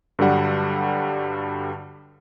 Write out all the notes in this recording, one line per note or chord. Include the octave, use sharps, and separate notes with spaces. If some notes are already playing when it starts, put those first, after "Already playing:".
G2 D3 F#3 G3 F#5